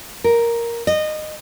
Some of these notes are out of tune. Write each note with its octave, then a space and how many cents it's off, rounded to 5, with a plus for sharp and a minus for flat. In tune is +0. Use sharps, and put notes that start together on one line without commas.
A#4 +5
D#5 -20